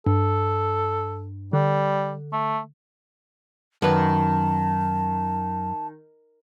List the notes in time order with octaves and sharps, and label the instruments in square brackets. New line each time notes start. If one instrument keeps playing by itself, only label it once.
[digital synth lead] G2 [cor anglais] A4
[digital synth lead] D3 [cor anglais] G3
[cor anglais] A3
[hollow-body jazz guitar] F#2 B4 [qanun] D#3 [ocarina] A5